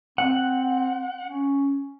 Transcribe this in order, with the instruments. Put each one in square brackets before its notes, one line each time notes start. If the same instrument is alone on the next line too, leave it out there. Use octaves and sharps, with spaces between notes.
[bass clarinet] C4 [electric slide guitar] F#5
[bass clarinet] C#4